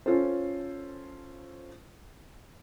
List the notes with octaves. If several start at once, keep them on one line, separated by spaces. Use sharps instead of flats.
C#4 F4 A4 C5